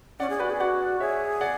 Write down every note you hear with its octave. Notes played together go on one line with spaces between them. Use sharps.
C#4 D5 F#5
G#4
F#4 B4 D5
G#4
F#4 D5 F#5
G#4 C#5 E5
D5 F#5